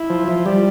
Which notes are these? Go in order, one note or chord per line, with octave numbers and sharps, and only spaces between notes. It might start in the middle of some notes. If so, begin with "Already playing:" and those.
Already playing: E4
F3
F3
G3